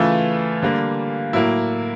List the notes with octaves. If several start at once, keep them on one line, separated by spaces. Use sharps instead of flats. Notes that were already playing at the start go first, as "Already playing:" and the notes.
Already playing: C#3 E3 A3 F4
D3 G3 A#3
A2 F#3 A#3 E4